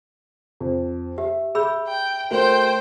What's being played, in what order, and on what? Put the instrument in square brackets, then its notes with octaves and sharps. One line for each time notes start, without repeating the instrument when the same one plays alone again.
[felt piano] F2
[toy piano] G4 [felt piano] E5
[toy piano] G#4 B5 E6 [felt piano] E5 G6
[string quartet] G5
[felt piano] A3 F#4 A#4 [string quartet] C5 G5